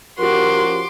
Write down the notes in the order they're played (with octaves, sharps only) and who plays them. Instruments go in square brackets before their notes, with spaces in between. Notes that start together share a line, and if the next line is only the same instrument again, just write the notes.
[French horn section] F3 C#4 A#4 [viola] F#4 G4 [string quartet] C6 D6